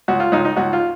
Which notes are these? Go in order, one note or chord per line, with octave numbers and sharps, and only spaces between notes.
C#2 F#4
F4
C#2 D#4
D#4
C#2 F#4
F4